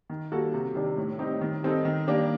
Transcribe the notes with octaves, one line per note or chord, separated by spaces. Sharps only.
D#3
G3 A#3 F#4 A4
C3
D#3 G3 D4
A2
G3 C4 D#4 G4
D#3
G3 C4 D#4 A4
D#3
G3 A#3 D4 G4